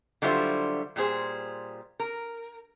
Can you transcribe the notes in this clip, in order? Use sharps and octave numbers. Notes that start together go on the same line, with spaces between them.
D3 F#3 G3 E4 F4 C5
A#2 G3 G#4 C5
A#4